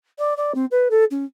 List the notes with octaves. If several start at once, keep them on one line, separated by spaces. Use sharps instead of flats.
D5
D5
C4
B4
A4
C#4